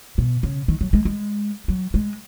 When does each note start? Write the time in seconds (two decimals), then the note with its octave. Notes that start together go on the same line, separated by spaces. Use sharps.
0.18 B2
0.43 C#3
0.68 D#3
0.81 F#3
0.93 G#3
1.05 G#3
1.68 F#3
1.94 G#3